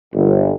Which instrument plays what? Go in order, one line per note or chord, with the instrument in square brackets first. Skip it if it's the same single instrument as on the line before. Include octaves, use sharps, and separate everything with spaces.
[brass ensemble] G1